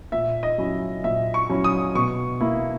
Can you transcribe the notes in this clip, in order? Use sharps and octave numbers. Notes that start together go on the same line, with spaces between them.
A#2 E5
D#5
F#3 C#4 E4
A#2 E5
C#6
F#3 C#4 E4
D#6
B2 C#6
A#3 E4